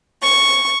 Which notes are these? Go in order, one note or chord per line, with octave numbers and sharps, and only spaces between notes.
C#6